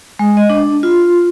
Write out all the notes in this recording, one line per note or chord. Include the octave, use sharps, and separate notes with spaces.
G#3
D#5
D4
F4